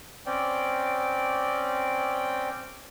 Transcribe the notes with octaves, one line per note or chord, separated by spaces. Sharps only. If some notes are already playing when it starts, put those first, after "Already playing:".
C4 C#4 D5 G5